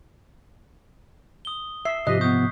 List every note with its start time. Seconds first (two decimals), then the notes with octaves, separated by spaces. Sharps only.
1.45 D#6 G7
1.85 E5 C7
2.07 G#2 C3 F3 G4 D#5 F#6 B6
2.21 B3 C#6 D#6 G6